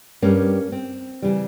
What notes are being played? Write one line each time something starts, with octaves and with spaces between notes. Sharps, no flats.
G2 G3 A#3 C#4
C4
C#3 E3 G3